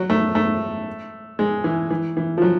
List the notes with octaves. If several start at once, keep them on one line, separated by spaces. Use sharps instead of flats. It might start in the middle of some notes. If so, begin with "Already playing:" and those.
Already playing: F#3
A3
A3
G#3
E3
E3
E3
F3
F#3